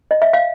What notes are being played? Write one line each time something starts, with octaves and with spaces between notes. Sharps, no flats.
D#5
E5
F5